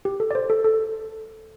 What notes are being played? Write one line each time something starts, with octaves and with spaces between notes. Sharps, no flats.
G4
A4
D5
C5
A4
A4